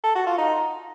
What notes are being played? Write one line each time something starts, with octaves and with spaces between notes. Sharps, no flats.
A4
F#4
F4
D#4